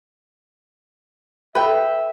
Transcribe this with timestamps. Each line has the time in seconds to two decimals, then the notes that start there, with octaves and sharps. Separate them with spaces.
1.55 A4 B4 E5 G5